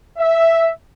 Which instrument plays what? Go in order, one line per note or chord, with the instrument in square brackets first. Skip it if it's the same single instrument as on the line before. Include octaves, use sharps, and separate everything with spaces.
[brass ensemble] E5